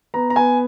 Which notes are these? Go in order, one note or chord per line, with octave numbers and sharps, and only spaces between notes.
B3 A#5
A#5
B3 G#5